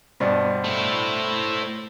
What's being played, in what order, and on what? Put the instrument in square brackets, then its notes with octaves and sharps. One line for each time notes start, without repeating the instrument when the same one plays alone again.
[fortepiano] G2 B2 D4 [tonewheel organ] C5
[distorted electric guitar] A3 E4